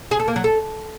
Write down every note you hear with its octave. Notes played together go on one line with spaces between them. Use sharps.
G#4
A4
A#3
F#3
A4